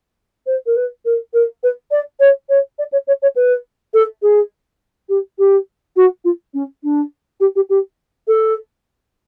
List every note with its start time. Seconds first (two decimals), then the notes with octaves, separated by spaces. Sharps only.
0.46 C5
0.66 A#4
0.76 B4
1.05 A#4
1.34 A#4
1.63 B4
1.91 D5
2.20 C#5
2.49 C#5
2.78 D5
2.92 C#5
3.07 C#5
3.22 C#5
3.36 B4
3.94 A4
4.22 G#4
5.09 G4
5.39 G4
5.96 F#4
6.24 F4
6.54 C#4
6.83 D4
7.40 G4
7.56 G4
7.70 G4
8.28 A4